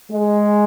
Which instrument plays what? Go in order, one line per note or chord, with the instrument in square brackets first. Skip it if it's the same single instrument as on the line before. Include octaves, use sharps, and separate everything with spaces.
[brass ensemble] G#3